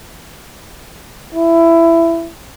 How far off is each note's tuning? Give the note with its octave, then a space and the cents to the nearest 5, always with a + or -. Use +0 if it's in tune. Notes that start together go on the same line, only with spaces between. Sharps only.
E4 +15